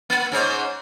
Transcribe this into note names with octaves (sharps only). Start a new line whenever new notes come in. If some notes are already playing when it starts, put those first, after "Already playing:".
A#3
G#2 C#4 C5